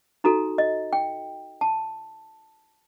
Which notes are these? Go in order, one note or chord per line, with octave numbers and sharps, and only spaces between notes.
D#4 F#4 A4 A#5
D#5
G5
A5